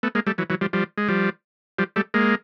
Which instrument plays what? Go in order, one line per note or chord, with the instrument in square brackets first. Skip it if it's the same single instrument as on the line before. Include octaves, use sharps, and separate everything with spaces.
[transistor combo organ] A3 B3
G#3 A#3
G3 A3
E3 F#3
E3 F#3
F3 G3
F3 G3
G#3
F3 G3
F3 G3
G3 A3
G#3 A#3